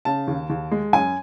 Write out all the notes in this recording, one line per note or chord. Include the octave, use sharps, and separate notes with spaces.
C#3 A5
D#2
D#2
G#3
F#2 G#5